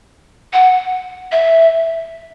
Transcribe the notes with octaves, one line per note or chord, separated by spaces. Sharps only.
F#5
E5